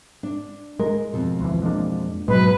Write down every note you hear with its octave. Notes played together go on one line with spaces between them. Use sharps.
D4
G#3 A#4
F2 B2
D2 E3
G#3 A#3 D4
G#2 B2 F#3 G#3 B4